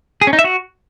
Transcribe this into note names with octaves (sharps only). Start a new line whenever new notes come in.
G#4
C#4
D#4
E5
F#4